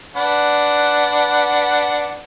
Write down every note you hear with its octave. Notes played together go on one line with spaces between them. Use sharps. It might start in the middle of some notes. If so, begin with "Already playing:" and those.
D4 B4 F#5